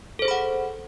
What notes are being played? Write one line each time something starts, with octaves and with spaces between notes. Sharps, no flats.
G#4 A4 C5 F#5 B5